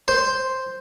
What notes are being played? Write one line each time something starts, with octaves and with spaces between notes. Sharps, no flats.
C5 C6